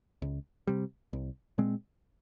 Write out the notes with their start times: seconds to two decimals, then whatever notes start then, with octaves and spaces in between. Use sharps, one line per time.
0.22 C#2
0.67 C3 G3
1.13 C2
1.58 A#2 G#3 C4